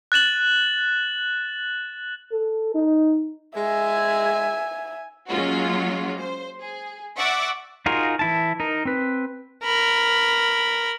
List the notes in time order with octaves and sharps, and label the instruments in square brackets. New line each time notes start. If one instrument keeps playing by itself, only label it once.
[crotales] F#6 A6 E7 F#7
[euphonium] A4
D#4
[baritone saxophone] G#3 [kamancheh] E5 G#5
[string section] F#3 G#3 A#3 C#4 F4 F#4
C5
G#4
D5 E5 F#5 C#6 D6 E6
[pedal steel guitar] D#4 F4 F#4 G#4 A#4
E3 E4 A5
D#4 A#4
C4 B4
[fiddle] A#4 B5